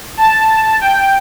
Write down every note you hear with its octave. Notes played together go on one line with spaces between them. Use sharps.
A5
G5